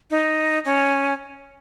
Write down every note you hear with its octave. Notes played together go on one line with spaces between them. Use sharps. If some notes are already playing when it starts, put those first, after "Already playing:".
D#4
C#4